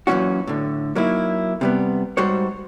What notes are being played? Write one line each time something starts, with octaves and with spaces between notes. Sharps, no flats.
F#2 A#2 D#3 E3 C#4 F#4
A2 D3
F#3 A#3 D#4 E4
C3 G3 B3
G#2 G3 F#4 C5 C#5